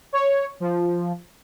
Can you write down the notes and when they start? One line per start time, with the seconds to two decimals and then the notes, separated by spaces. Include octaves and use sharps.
0.13 C#5
0.60 F3